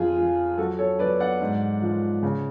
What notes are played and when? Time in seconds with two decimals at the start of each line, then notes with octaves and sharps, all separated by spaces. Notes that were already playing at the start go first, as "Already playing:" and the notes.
Already playing: F2 F4 G#4
0.17 F3
0.58 F#3 F#4 A4
0.78 A4 C#5
0.99 F#3 B4 D5
1.20 D5 F#5
1.41 G#2
1.82 F3
2.23 C#3